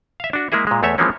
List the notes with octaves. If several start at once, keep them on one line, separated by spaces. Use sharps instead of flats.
E5 F5
D4 F#4
G#3 A#3 E4 G#4 E5
A#2 G#3
E2 A3 C#5 E5
E3 F3 G#3 A#3 C4 C#4